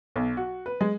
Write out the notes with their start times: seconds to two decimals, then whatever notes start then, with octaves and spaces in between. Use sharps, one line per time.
0.16 B1
0.37 F#4
0.66 B4
0.81 G#3